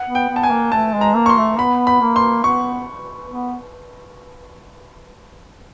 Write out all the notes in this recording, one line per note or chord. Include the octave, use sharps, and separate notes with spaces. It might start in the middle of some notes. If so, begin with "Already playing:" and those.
Already playing: F#5
B3
G5
B3
A5
G#5
A#3
A3 A5
G#3
A#5
A#3
C#6
C6
A3
B3 B5
B5
A#3
C6
B3 C#6
B3